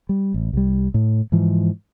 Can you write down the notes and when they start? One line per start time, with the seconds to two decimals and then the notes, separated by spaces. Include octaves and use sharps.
0.09 G3
0.34 A1
0.53 C2 G3
0.94 A2
1.32 G#2 E3 F3